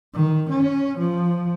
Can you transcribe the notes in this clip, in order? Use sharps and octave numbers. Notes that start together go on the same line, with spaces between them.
D#3
C#4
F3